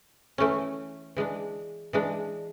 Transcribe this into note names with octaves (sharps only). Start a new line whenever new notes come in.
E3 A3 C#4
E3 G#3 D4
E3 G#3 D4